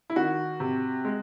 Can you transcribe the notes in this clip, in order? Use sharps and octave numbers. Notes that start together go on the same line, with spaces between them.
E4
D#3 F#4
C3
G#3